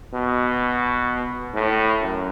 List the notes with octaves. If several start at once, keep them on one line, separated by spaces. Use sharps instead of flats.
B2
A2
F#2